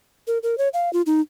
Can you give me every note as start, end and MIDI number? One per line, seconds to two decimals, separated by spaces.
0.27 0.38 70
0.43 0.58 70
0.58 0.68 73
0.74 0.92 77
0.93 1.02 65
1.06 1.21 63